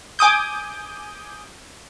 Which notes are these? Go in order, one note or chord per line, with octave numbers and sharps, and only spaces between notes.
G#5 D6 D#6 G6